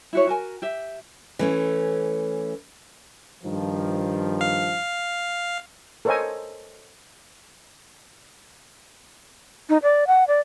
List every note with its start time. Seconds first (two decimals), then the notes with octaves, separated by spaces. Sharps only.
0.13 E4 F#4 C#5
0.27 F#4 A#4 G#5
0.62 G4 E5
1.39 E3 A3 C#4
3.44 G2 D#3 F3
4.41 F5
6.05 A4 A#4 C5 C#5 D#5 G#5
9.69 D#4
9.83 D5
10.07 F#5
10.28 D5